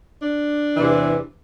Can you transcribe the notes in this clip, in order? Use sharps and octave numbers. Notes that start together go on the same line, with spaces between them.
D4
E2 C3 E3